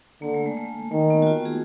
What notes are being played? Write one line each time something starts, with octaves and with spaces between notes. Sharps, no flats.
D3 A#3
A3
G#3
A3
D#3 A3
B3
F#4
F4
G#4